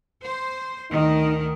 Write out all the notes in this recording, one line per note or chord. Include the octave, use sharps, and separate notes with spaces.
C5
D2 D#3 D#4